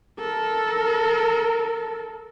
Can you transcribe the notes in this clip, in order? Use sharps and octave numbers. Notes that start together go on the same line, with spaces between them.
A4 A#4